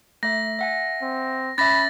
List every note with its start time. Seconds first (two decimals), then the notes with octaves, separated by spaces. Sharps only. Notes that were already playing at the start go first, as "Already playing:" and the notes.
0.23 A3 E5 A#6
0.59 E5 F#5 G#5
1.02 C4
1.58 C#4 E5 B5 A6 A#6